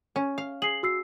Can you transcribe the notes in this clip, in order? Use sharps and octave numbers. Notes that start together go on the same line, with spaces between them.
C#4
F5
G#4 C7 F#7
F#4 E6 C7